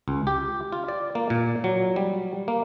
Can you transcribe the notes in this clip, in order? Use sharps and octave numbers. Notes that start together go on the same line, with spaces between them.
C#2
G4
F4
D5
A#3
A#2
F#3
G3
A#3